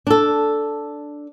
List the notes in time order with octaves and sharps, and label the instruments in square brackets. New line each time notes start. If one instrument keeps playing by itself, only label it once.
[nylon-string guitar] D4 A4